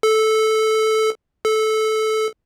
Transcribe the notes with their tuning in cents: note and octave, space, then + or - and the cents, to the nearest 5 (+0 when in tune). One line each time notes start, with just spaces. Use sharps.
A4 -10
A4 -15